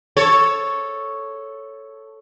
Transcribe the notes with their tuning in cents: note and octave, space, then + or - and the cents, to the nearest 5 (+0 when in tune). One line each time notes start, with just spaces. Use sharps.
A4 +0 C#5 +0